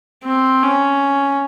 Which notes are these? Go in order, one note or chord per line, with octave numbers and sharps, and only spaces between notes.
C4
C#4